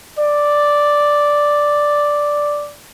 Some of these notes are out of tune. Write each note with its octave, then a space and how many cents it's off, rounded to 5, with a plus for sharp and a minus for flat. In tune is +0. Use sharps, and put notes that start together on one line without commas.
D5 +0